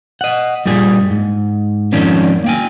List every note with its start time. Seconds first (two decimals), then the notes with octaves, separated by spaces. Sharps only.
0.21 D#5 F#5
0.66 G2 A#2 G3 G#4
1.10 G#2
1.93 F2 G#2 D#3 C#4 D4
2.44 A#3 G5 G#5